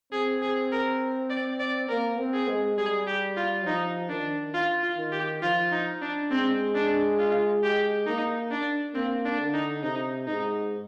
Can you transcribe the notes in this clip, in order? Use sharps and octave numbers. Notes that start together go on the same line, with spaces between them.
C4 G#4
G#4
A#4
D5
D5
A#3 A#4
C4
G#4
G#3
G3 G#4
G4
F4
F3 D#4
D#3 D4
F4
F4
D#3
G4
F3 F4
D#4
D4
G#3 C4
D4
F4
G4
A#3 D#4
D4
A#3 C4
D4
D3
D#4
C3 D#4
G#2 D#4